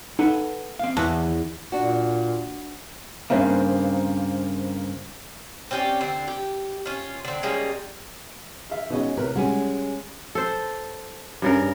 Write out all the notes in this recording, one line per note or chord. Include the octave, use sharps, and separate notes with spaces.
D#4 A4 B4 F#5
C4 F5
E2 E3 A5 F#6 B6
A#2 D4 F#4
G2 A#2 C#3 A#3 C4 C5
C4 C#4 G4 D5
D3 C4
G4
C#4 F4
D3 C4
G3 G#3 A#3 C#4
E5 F5
B2 G#3 C#4 D#4 D#5
A2 C3 A#4 B4
G3 G#3 C#4 F#4 G#5
A4 C5
G2 C#3 A#4